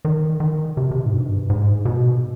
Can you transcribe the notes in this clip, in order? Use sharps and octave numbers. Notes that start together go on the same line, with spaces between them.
D#3
D#3
C3
C3
B2
G#2
G2
G#2
B2